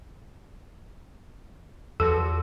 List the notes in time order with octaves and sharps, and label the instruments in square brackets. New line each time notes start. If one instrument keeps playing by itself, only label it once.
[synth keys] E2 F3 F#4 [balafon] A4